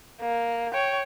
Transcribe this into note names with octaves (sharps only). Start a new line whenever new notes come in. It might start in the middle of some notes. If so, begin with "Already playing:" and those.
A#3
C#5 G5